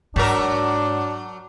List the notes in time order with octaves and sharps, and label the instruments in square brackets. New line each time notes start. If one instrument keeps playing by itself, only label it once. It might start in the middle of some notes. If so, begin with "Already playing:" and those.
[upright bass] G#2 [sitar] F#3 A#4 [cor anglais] D4